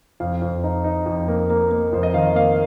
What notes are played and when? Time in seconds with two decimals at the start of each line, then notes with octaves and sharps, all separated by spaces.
0.20 F2 F5
0.42 F2
0.64 D#4
0.84 D#4
1.06 F2
1.28 A#3
1.50 A#3
1.71 A#3
1.92 F2 C5
2.03 D#5
2.14 D#3 F5
2.35 A#3 F5